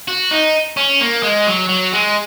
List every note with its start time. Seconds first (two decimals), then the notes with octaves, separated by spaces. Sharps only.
0.08 F#4
0.31 D#4
0.77 C#4
1.01 A#3
1.23 G#3
1.47 F#3
1.69 F#3
1.93 G#3